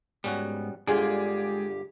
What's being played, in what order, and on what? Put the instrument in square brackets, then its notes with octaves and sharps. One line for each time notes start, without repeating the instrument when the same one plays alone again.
[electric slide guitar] G#2 B3 [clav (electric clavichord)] G3 C#4 F#4
[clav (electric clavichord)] G1 D3 F4 [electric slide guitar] G#3 D5 [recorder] G4 [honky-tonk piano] G#4